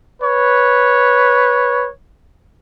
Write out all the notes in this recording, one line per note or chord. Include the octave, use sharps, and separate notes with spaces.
B4 C#5